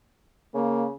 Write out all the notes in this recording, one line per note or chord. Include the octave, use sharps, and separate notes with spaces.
C#3 A#3